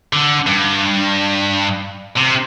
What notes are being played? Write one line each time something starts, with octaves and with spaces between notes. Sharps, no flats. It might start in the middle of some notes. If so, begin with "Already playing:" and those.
D3
G2
C3